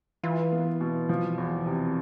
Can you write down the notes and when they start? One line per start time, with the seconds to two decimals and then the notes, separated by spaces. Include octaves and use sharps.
0.23 E3 F4
0.52 B3
0.81 B2
1.09 F3
1.38 E2
1.66 C3